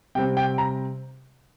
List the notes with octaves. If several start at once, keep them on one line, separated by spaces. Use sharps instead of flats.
C3 G3 C4 G5
G5
A#5